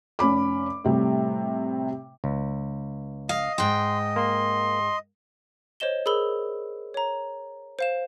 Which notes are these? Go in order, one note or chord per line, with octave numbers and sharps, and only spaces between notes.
F1 C#4 B5 D6
A2 C3 G3
C#2
D#5 F5
G#2 G5 C6
A#3 C6
C5 C#5 D#5 E7 G7
G#4 A#4 B5 E6 G7
C#5 A#5
C5 F5 E7